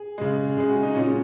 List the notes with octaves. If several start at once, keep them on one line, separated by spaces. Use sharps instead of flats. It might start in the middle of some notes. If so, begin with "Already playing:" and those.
Already playing: G#4
C#3 G#3
C#3 G#3 G#4
F#4
D#4
A#2 G#3 C#4